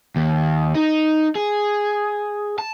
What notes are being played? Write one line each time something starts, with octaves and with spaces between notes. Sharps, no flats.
D#2
D#4
G#4
A5